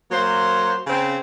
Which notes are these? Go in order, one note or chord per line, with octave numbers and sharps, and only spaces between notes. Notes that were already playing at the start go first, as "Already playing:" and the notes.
F#3 A#3 C5
C#3 C4